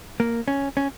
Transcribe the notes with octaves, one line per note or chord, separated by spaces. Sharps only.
A#3
C#4
C#4